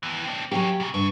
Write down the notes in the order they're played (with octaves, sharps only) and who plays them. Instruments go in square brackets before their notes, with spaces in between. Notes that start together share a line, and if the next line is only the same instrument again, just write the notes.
[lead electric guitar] D#2 E3
C4 D4
[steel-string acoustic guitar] F#3 G4 [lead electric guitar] A#3 C#4
[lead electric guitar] A#2 C#3
[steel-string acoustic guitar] G2 [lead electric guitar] C#3